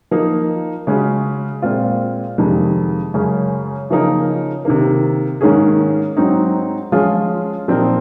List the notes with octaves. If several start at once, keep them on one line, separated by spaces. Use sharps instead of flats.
F3 A#3 D#4
C#3 G#3 C#4 F#4
A#2 G#3 C4 F4
F2 C3 D#3 G#3
F#2 C#3 G#3 C#4
C#3 F3 A#3 D#4 A#4
C3 D#3 A#3
G#2 D#3 A#3 C#4 G#4
G#2 F#3 C4 D#4
F3 G#3 C#4 F4 G#4
A#2 F3 C4 D#4 A#4